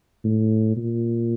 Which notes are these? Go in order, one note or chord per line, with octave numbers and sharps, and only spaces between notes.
A2
A#2